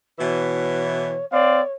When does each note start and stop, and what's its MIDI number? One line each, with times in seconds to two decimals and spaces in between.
0.19 1.17 47
0.19 1.17 52
0.19 1.25 73
1.31 1.60 60
1.31 1.71 73
1.31 1.60 74
1.31 1.60 77